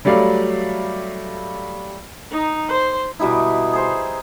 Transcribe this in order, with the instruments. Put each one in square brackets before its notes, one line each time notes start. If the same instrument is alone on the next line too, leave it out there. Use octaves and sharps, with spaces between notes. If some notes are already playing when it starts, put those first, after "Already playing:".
[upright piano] F#3 G3 A3 D5 F5
[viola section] D#4
C5
[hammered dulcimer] B2 G3 D#4 E4
G#4 C5